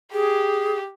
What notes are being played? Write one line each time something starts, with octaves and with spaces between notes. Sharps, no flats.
G4 G#4